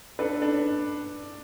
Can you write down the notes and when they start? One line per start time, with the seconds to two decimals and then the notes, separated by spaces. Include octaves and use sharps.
0.19 D4 A4 B4
0.42 D4